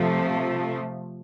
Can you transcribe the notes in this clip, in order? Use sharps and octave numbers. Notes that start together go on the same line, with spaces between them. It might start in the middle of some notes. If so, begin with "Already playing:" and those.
Already playing: C3 F3 A3